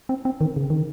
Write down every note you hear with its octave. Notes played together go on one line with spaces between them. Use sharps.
C4
C4
D#3
C#3
D#3